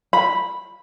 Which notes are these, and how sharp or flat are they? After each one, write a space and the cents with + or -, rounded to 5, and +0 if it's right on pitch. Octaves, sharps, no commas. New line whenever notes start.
B5 -5